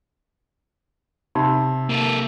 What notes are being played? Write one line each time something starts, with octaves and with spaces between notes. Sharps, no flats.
C3 D#4 G4 B5
A#3 A4